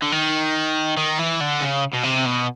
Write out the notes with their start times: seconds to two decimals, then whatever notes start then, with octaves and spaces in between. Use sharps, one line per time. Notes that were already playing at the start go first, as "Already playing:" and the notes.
0.02 D3
0.12 D#3
0.97 D#3
1.19 E3
1.41 D3
1.61 C#3
1.93 B2
2.03 C3
2.25 B2